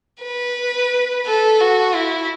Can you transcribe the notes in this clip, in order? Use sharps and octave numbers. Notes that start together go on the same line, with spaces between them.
B4
A4
F#4
E4